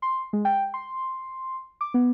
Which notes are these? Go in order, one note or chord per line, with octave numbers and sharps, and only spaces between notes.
C6
G#3
G5
C6
D6
B3